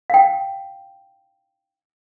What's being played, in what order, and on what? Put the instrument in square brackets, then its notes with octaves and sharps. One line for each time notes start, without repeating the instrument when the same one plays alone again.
[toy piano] F5 G5